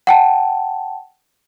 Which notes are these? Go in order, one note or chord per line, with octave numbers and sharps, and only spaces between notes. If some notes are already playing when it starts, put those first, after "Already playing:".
F#5 G5 A5